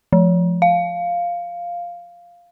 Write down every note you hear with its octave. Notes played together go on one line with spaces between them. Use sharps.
F3
F5